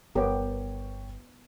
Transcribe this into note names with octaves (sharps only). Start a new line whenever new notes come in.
G1 B3 G4 A#4 C#5 G5